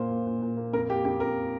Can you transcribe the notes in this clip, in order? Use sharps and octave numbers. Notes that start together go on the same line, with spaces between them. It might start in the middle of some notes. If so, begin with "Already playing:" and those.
Already playing: A#2 A#3 C5
A#2
A#2
A#2
A#3
F2 A#4
A#3 G4
F2 G4
F2 A#4